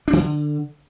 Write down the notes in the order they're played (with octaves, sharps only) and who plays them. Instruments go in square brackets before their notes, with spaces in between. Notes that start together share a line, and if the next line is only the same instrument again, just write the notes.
[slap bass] D4
D#3
D3